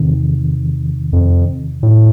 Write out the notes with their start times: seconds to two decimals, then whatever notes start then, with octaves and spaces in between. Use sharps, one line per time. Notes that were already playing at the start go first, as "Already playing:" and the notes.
Already playing: E2 C3 D#3
1.13 F2
1.83 A2